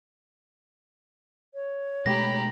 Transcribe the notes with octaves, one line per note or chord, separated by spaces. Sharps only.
C#5
B2 G#3 A3 G4 A#5 B5 A#6